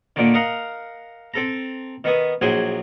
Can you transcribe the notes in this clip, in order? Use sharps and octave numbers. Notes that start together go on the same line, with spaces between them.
A#2 D3 D#3
A#4 D#5 F5 F#5 A#5
C4 A4 A#5
D#3 B3 E5 D#6
A#1 F#3 E4 G#4 C5 G#5